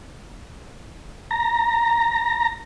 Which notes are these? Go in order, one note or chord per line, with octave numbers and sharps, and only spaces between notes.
A#5